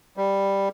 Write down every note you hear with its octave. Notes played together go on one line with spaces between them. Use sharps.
G3